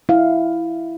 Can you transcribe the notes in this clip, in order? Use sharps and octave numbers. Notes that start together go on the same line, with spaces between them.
E4 F5